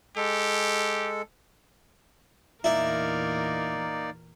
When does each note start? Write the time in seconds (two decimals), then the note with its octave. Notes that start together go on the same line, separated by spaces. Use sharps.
0.16 G#3 G4 A4
2.64 E2 A#2 A#3 D#4 E4 A#4 D5